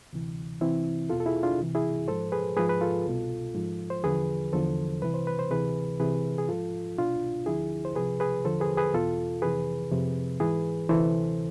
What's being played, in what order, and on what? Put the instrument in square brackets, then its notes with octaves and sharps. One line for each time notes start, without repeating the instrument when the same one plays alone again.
[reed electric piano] D2 C3 E3
C2 C3 E3 C4 E4
E2 B2 F4 A4
A4
E4 G#4
D4 F4
C2 C3 E3
E4 G#4
G#2 F3 A4 C5
G#4 B4
G#2 F3 G#4 B4
B4
F4 A4
C2 B2
G#2 F3
C5
E2 D3 F3 G#4 B4
E2 D3 F3 A4 C5
C2 C3 E3 B4
C5
B4
C5
D2 C3 E3 G#4 B4
C2 C3 E3 G#4 B4
G#4
G#2 F3 F4 A4
C2 B2 D4 F4
D2 D3 F3 E4 G#4
C5
C2 C3 F3 G#4 B4
G#4 B4
E2 D3 F3 A4 C5
G#4 B4
G#4 B4
E2 B2 F4 A4
F2 C3 E3 G#4 B4
F2 C3 F3
G#2 E3 G#4 B4
D2 C3 E3 A4 C5